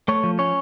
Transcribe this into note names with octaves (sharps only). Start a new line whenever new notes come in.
A3 C#5
F3
C#4 C#5